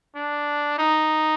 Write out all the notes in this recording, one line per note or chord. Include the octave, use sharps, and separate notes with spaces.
D4
D#4